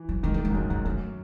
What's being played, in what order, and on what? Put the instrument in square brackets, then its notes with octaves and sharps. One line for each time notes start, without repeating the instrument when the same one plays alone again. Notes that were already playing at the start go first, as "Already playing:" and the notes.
Already playing: [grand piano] E3
[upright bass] F#3
[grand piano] D#3 [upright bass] G#3
[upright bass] A3
G#3
[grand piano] G#2
[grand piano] F#2 [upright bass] A3
[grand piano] G#2 [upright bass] G#3
[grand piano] F#2 [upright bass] A3